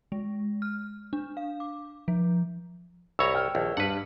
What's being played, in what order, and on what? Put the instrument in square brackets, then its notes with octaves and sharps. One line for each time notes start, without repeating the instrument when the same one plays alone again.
[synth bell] G#3
F6
D4
F5
D6
F3
[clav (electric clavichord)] C2 C#5 A#5 [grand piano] B5 C#6 E6
[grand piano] G5 F6
[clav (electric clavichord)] A#1 D#2
[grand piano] G2 [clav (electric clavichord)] B4 F#5